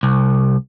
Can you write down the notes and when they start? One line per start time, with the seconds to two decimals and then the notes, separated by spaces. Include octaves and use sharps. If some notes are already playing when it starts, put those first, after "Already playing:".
0.03 C2